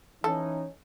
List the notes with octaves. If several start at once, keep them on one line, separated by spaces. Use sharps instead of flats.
E3 C#4 D#4 A4